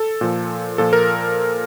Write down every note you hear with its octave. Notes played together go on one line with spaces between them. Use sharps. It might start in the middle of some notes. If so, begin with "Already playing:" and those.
Already playing: A4
A#2 F3
A#2 F3 A4
A#4